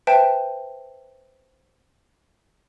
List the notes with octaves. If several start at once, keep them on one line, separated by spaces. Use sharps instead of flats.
B4 C5 E5 G5 A5